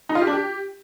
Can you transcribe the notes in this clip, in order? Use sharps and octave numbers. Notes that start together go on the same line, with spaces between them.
D#4
F4
G4
D4
G4